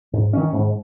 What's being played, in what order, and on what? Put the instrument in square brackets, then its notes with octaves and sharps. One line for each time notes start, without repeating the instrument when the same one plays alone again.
[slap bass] G#2
D#3 C#4
G#2